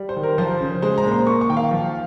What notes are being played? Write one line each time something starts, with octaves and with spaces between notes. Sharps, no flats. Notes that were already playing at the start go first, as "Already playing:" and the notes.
Already playing: G3
C5
D#3
A#4
F3 C5
C#3
G#3 C5
A#5
A#2
C6
A#3 C#6
C#6
D#3 G5
F5
F3